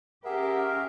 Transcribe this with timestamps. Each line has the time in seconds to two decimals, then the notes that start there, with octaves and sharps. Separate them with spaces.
0.25 C#4 G4 G#4 A#4 E5 F#5